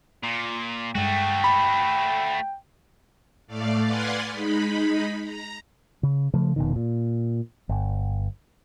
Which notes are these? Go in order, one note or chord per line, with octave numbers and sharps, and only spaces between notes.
A#2
G2 G#3 A3 F#4 G5
B5
A2 A3 D5 F5
B4 D5 F5 F#5 G#5 C6
G#3 D#4 B5
A#5
C#3
C#3 F3 A3
F1 B2 D#3
A#2
G1